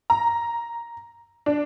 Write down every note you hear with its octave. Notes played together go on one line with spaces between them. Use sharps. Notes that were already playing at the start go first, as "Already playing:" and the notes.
A#5
D4